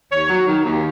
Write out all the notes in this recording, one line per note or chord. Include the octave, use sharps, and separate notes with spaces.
D#2 C#5
F#3
D#3
D#2